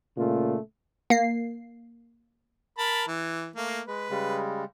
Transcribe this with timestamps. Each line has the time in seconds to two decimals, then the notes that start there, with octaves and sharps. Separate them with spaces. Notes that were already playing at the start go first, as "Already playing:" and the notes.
0.17 A#2 C#3 A3 F4
1.10 A#3 C7
2.78 A#4 A5 B5
3.07 E3
3.56 A3 A#3
3.87 G#3 B4
4.10 C#3 G3 G#3